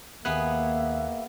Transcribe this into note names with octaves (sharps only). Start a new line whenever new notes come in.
D#2 A#3 B3 G#4 E5 F#5 F#6